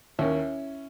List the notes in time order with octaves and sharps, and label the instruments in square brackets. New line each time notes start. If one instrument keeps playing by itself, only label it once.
[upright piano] D#2 D#3 C#4 E4